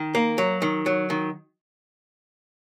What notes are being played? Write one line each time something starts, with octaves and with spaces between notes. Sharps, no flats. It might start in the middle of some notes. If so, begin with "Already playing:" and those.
Already playing: D#3
A#3
F#3
D#3
F#3
D#3